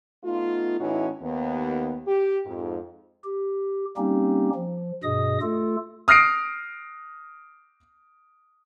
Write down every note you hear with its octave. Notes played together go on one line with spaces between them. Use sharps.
A3 B3 D#4 F4
A2 E3 C#4 D#4 E4 F#4
D#2 B3
G4
F2 G#2
G4
G3 A#3 C4 C#4 D#4 G4
F3
G2 B2 G#4 D#5 D#6
A3 F4 A4
D#6 F6 F#6 A#6 C7 D7